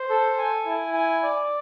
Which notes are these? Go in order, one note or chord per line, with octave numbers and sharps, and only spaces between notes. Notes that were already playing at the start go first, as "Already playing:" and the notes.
Already playing: C5
A4
G#5
E4
G#5
D5